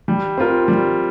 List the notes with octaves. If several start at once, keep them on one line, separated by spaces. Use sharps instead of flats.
G3
C4 F4 A#4
G3